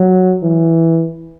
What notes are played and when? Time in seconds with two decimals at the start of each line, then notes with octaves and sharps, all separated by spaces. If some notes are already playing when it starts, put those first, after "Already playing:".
Already playing: F#3
0.43 E3